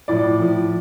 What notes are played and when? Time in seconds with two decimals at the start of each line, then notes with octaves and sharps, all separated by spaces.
0.08 A2 F3 D5
0.40 A2 F3